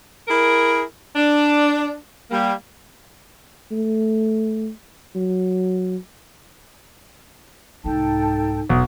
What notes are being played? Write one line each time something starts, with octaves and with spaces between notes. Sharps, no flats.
E4 G#4 A#4
D4
G3 A#3
A3
F#3
C2 G#2 D#4 A4 G5 A5
E1 B1 D#6